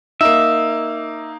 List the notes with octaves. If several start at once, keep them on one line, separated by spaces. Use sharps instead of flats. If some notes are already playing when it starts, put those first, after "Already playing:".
A#3 D#4 E5